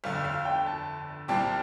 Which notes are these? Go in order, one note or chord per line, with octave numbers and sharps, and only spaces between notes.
G1 F2 D3 F5
F5
G5
A5
C2 A#2 G3 C4 G4 A5